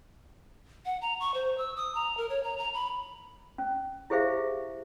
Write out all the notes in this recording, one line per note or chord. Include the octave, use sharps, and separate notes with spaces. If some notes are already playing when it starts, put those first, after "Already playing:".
F#5
A#5
C#6
C5
E6
D#6
A#5
A#4
C#5
A#5
A#5
B5
C#4
E4 G4 G#4 C5 E5 F5